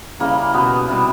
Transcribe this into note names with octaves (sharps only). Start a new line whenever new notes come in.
C#3 E3 G3 A#3
B2 B3
C3 E3 G3